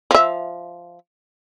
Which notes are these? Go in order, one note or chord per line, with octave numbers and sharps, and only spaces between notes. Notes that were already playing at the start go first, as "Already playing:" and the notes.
F3 E5